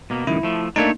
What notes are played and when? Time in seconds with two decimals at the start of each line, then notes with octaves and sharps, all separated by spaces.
0.10 B2 A#3
0.27 C#2 F#2 D#3 E4
0.43 F3 A3
0.76 A3 A#3 D4 D#4 C#5